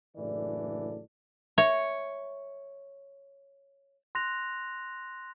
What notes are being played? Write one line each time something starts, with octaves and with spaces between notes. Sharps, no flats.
F#1 A2 E3 D4 A4 D5
C#5 E5
C6 F#6 A#6 F7